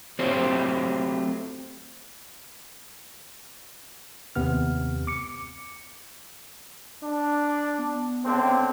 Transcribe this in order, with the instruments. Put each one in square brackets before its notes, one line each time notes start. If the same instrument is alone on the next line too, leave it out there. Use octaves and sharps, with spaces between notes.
[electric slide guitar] F#3 A3 C4 G4 C5 C#5
[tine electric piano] D#2 C3 B3 F6
D6 C#7
[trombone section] D4
[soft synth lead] B3
[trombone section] C#2 D3 C4